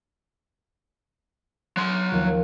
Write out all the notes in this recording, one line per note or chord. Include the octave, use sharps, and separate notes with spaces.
F#3 C6
D#2 F3